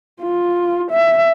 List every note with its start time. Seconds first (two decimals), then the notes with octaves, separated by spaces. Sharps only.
0.22 F4
0.91 E5